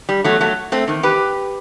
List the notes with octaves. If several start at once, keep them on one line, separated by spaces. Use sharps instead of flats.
G3
E2 B2 F#3 A3
F#3 A3
A3 C4
E2 D#3
G4 B4